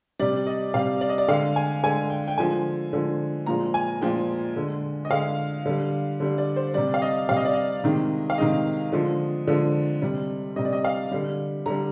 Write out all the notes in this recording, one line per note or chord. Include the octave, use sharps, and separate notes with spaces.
C3 G3 D5
D#5
C3 G3 F5
D5
D#5
D5
D3 G#3 F5
G#5
D3 G#3 G#5
G5
G5
D3 F3 G#3 G#5
D3 F3 G#3
A#2 F3 G#3 A#5
G#5
A#2 F3 G#3 G5
D3 G#3
D#5
D3 G#3 F5
D3 G3
D3 G3
D5
C5
C3 G3 D5
F5
D#5
C3 G3 F5
D#5
D5
D#5
C3 D#3 G#3
F5
C3 D#3 G#3 D#5
D3 F3 G#3
D3 F3 G#3
C3 G3
C3 G3 D#5
D5
D#5
F5
D3 G3
D3 G3 A#5